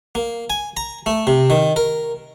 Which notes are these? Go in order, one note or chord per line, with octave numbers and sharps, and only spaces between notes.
A#3
G#5
A#5
A3
C3
D#3
A#4